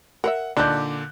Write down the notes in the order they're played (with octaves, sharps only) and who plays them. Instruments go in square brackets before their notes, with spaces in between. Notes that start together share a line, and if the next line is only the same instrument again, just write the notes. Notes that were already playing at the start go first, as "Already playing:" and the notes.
[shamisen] A#4 C5 E5 [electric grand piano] F#5
[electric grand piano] A#2 D3 A5 [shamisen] D4 D#4 [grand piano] D6 F#6 G6